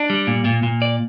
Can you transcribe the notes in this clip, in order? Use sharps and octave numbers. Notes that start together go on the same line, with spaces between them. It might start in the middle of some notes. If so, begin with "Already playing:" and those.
Already playing: D4
G3
A#2
A#2
A#2
D5